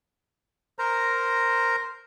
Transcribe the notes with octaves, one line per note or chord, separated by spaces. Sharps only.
A#4 C5 A#5